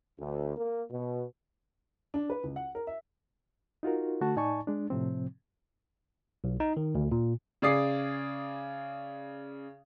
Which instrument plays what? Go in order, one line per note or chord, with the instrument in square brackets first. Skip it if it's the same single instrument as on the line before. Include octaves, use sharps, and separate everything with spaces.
[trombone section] D2
A#3
B2
[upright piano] D4
B4
C#2
F#5
A#4
E5
[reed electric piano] D#4 F4 F#4 A#4
D3 A3 F#4 A5
A2 D#4 D5 G#5 A5 C#6
G#3 D4
A2 C3 F3 C4
[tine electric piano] B1
D#4
D#3
D2
A#2
[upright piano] C#3 G#4 D5 D#6 C7